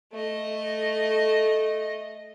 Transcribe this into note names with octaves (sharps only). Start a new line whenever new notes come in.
A3 D#5